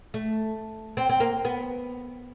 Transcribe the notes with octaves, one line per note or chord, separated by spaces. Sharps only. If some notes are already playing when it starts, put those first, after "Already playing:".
A3
C4
C4
A#3
B3